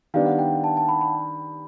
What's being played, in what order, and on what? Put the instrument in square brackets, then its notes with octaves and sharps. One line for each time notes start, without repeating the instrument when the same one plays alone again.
[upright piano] D#3 G3 B3 D4 [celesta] F5
[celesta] F#5
G5
A5
A5
B5
B5